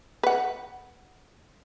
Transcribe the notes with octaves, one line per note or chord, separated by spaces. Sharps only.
B4 F#5